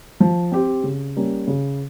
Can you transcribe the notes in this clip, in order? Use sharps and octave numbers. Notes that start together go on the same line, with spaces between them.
F3
C4 G4
C#3
G3 A#3 C#4
C#3